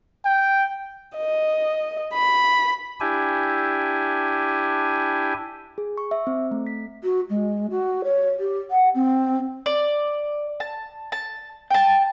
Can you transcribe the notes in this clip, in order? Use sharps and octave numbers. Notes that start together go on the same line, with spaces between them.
G5
D#5
B5
D4 E4 G4 G#5
G#4
C#6
E5
C4
A3
B6
F#4
G#3
F#4
C#5
G4
F#5
C4
D5
A5
A5
G5 A5